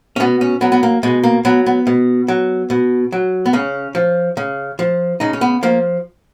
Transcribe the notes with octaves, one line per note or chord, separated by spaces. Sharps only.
C#4
B2 B3
C#4
F#3 B3
B3
A#3
B2 G#3
A#3
F#3 B3
B3
B2
F#3
B2
F#3
B3
C#3 C#4
F3
C#3
F3
C#3 D#4
C#4
B3
F3 A#3